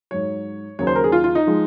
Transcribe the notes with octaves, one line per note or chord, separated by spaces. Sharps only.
G#2 F#3 C#5
D#2 C#3 F#3 C#5
C5
A#4
G#4
F4
F4
D#4
F3 G#3